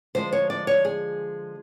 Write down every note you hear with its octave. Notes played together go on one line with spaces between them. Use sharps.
D3 F3 G#3 C5
C#5
D5
C#5
G#4